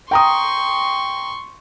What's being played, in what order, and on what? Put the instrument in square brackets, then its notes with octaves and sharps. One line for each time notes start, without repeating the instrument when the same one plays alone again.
[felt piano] G5 A#5 D#6 [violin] C6 C#6